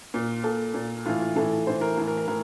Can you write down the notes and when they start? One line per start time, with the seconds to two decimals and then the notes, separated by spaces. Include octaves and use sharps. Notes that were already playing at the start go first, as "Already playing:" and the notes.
0.14 A#2
0.44 A#2 A4
0.74 A#2
1.06 A2 E3 F4
1.20 F4
1.36 A2 E3 A4
1.67 A2 E3 C5
1.81 A#4
1.97 A2 E3
2.08 A#4
2.18 A#4
2.28 A2 E3 A#4